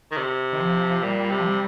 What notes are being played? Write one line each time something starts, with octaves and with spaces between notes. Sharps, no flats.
D#3
C3
D#3
F3
A#2 G3
C3
F3
G3